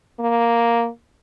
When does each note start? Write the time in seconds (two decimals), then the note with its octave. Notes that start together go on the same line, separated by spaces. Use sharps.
0.20 A#3